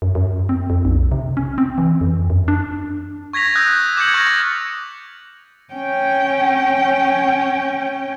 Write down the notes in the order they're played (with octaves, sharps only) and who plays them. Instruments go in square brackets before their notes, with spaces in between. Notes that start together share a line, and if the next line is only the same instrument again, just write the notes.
[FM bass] F#2
F#2
C4
F2
B1
C3
C#4
C4
E3
F2
F#2
D4
[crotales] C#6 G#6 A#6 B6 F7
D#6 E6 F#6 G6 A#6
F#6
D6 G6 G#6 C#7 F#7
C#6 F6 G6 A6 A#6
[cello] C#4 G5